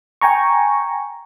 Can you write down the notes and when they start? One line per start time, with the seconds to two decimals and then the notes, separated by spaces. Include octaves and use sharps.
0.21 G5 G#5 A#5 C#6